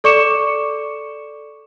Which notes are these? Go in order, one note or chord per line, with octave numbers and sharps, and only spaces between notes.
A4 D5 C#6 D6 C#7 E7